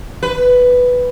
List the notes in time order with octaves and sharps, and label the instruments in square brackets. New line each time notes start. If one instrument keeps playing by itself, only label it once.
[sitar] B4